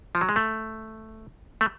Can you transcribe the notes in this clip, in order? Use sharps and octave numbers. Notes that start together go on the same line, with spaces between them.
F3
F#3
G#3
A3
A3